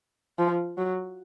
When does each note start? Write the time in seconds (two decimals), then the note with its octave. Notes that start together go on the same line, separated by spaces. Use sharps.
0.39 F3
0.78 F#3